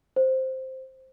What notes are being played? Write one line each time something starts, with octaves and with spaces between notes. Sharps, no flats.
C5